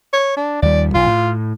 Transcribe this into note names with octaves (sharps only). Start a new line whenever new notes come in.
C#5
D4
D#2 G3 D5
B1 F4
A2